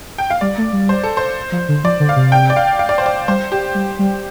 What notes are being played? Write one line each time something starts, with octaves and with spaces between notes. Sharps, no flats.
G5
F5
G3 D5
A3
G3
C5
A4
C5
F3
D3
F3 D5
D3
F5
C3
G5
D5
F5
F5
D5
C5
D5
G3 C5
G4
G3
G3